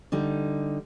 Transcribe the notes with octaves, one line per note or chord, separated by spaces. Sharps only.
D3 G3 D#4